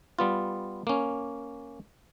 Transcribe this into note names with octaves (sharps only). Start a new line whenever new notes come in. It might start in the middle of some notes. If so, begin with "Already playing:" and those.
G3 B3 F4
A#3 C#4